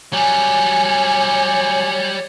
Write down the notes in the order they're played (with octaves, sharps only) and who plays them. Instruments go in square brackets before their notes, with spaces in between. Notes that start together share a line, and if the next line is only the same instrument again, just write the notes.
[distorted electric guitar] F#3 G3 [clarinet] C#5 [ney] G#5